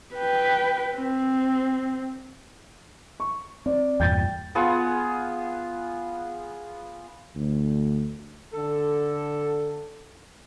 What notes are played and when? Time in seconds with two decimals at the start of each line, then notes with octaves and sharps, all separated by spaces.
0.15 B4 G5
0.96 C4
3.20 C#6
3.66 C4 D5
4.00 E2 G2 A#2 G5 G6 A6
4.55 B3 F4 G#4 F#5
7.36 D2
8.53 D3 A4